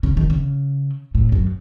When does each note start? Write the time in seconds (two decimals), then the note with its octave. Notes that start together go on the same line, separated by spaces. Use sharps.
0.03 C#3
0.17 D#3
0.30 C#3
1.15 A2
1.32 F#2